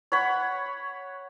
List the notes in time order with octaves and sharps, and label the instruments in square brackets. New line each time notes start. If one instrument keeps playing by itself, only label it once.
[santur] C#5 F#5 B5 C#6